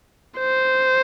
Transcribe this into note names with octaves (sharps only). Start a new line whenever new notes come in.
C5